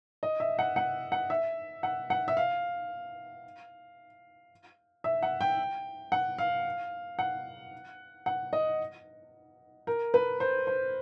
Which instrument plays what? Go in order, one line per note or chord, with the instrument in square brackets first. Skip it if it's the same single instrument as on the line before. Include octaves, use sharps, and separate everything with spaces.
[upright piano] D#5
E5
F#5
F#5
F#5
E5
F#5
F#5
E5
F5
E5
F#5
G5
F#5
F5
F#5
F#5
D#5
A#4
B4
C5
C5